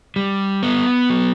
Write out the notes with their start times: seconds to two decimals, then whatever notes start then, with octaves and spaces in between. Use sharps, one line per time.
0.16 G3
0.63 B3
1.10 F#3